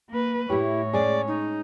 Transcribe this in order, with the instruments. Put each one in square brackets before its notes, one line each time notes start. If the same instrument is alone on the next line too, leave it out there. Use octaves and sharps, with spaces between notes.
[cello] A#3 B4
[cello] A2 [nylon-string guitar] A3 G4 [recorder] E4 [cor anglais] C#5
[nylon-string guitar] G#3 C#4 G#4 [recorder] D5
[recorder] D#4